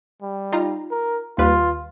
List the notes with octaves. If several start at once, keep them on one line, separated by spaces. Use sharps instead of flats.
G3
D#4 F4 A#5
A#4
D#2 G3 F4 B4